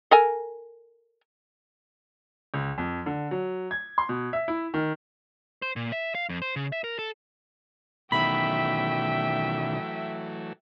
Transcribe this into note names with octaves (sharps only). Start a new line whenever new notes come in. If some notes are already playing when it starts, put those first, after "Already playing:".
A4 A#4 G#5
C#2
F2
D3
F#3
G#6
C6
B2
E5
E4
D#3
C5
A#2
E5
F5
F2
C5
C#3
E5
A#4
A4
B2 D#3 E3 F#3 A3 E5 G5 B5